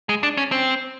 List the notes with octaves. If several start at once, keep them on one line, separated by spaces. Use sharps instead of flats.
G#3
D4
C#4
C4